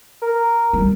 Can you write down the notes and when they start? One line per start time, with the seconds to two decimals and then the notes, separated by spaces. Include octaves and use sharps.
0.22 A#4
0.73 G3